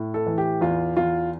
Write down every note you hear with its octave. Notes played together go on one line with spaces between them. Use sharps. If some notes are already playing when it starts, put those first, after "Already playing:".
Already playing: A2
A4
E3
G4
E2 F4
E2 F4